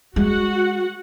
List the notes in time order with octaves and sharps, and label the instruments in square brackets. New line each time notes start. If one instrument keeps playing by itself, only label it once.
[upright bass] G#3 [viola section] F#4 F#5